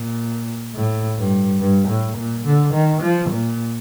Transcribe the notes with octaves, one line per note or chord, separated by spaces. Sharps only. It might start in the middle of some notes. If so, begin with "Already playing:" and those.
Already playing: A#2
A2
G2
G2
A2
A#2
D3
D#3
F3
A#2